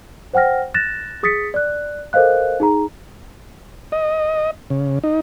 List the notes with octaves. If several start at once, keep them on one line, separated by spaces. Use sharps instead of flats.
C5 F#5 G5 F6 A#6
F#6 A6 A#6 E7
G#4 D#6 A6 B6 C#7
D5 F#6
A4 A#4 C5 D#5 F5 F#6
D#4 G#4 A#5
D#5
C#3
D#4